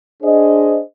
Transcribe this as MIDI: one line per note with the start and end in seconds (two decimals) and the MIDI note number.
0.23 0.81 62
0.23 0.81 68
0.23 0.81 72
0.23 0.81 75